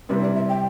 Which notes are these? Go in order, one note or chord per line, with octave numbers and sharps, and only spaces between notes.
C3 G3 C4 E4 G4 B4
D5
E5
G5